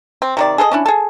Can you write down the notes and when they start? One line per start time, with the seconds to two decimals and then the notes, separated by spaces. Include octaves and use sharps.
0.22 C4
0.37 C3 D#3 D5
0.58 G#4 A4 B4 D#5
0.72 C#4 D4 E4
0.86 G#4 A4